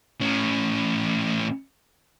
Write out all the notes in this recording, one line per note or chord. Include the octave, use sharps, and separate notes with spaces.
A2 C#4